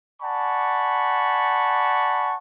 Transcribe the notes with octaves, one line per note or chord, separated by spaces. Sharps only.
D5 F#5 G#5 A5 B5 C#6